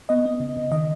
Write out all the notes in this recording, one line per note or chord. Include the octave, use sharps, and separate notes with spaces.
B3 D#5
B3
C#3
C#3
D#3 D#5